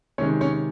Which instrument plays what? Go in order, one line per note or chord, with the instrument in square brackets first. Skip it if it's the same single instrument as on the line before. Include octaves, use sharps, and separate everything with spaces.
[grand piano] C3 D#3 G#3 C#4 C#5
C#4 C#5